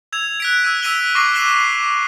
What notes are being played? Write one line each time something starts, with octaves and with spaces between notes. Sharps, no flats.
E6 G#6 F7
F#6 B6 D7
E6 G#6 D#7
E6 B6 D#7 F7 G7
C#6 D6 E6 A#6 C7 G7
E6 F#6 C7 E7 G7